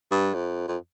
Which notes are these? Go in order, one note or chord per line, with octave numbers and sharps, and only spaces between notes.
G2
F2
F2